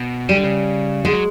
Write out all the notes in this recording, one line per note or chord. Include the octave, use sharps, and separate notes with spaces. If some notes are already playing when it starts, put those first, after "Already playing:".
Already playing: B2
C#3 G3
D3
C#3
D3 G#3
F#3